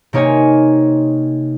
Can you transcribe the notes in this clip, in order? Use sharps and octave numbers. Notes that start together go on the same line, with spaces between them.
C3 A#3 D#4 C#5 G#5